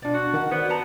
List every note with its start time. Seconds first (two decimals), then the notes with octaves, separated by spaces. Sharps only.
0.02 B2 D4 F4 D5
0.14 F#4
0.34 D#3 A#4 F#5
0.51 B3 F#4 C5 D5
0.70 B3 B4 A5 A#5